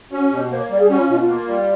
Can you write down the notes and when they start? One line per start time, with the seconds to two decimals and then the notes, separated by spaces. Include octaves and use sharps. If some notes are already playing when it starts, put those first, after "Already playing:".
0.11 C#4 F#4
0.31 B2 G4
0.50 A#3 C5
0.60 C#5
0.70 G3 D5
0.79 G#4
0.89 C#4 F#4
0.99 F4
1.09 B2 F4
1.19 F4
1.29 A#3
1.48 G3